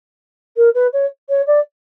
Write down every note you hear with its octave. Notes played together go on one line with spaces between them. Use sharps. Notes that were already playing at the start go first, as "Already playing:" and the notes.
A#4
B4
C#5
C#5
D5